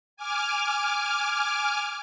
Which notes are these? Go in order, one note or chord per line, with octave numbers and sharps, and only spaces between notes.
G#5 D6 F6